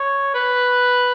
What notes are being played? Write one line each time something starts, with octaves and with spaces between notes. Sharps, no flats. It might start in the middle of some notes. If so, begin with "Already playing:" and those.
Already playing: C#5
B4